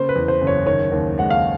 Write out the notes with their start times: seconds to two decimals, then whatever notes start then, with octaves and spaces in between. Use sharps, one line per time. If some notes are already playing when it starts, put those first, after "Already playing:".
Already playing: C#3 A#3 C5
0.09 B4
0.16 E2
0.28 C5
0.41 F#1
0.47 C#5
0.66 D#3 C#5
0.92 D#2
1.18 G#3 F#5
1.30 F5